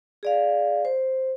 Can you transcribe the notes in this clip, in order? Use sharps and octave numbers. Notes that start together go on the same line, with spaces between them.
G#4 D5 F5
C5